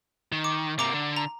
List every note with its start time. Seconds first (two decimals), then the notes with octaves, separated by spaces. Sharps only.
0.32 D#3
0.44 D6
0.79 C3 A#3 A#5 D6
0.93 D3
1.16 A#5